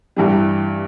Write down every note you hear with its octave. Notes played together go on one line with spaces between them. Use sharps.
G2 E3 G3